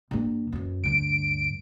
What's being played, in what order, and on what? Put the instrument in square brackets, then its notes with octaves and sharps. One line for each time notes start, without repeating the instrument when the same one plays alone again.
[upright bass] G2 A#3
F#2 E3
[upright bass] D2 G2 [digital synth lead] D7